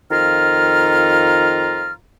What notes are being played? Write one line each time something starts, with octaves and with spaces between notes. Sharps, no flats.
F2 D#3 F4 A#5 F6